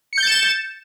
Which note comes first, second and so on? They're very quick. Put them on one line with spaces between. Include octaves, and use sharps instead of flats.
C#7 G6 A6 E7